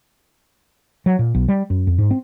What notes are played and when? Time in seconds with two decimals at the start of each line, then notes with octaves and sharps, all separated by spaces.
1.06 F#3
1.19 A#2
1.35 B1
1.48 G3
1.70 F#2
1.87 F2
1.98 G#2
2.11 C4